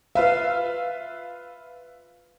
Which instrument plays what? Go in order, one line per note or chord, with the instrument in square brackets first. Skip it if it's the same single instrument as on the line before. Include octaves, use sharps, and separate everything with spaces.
[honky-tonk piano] F4 B4 E5 [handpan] F5